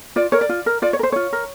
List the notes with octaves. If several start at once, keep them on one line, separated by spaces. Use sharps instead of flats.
F4 D5
A#4 C#5
D5
F4
A#4
F4 D5
C#5
A#4
C5
F4 C#5
A#4